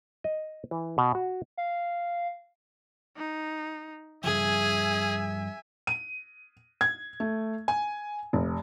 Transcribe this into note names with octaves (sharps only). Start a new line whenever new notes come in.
D#5
E3
B2
F#4
F5
D#4
G2 C#3 F3 G#4 E5 G#5
D#7
G#6
A3
G#5
F1